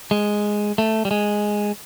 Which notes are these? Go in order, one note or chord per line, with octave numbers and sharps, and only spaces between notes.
G#3
A3
G3
G#3